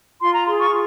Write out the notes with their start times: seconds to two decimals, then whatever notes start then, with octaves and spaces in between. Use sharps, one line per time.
0.21 F4 C6
0.34 A#5
0.46 G#4 C6
0.59 C#6
0.71 F4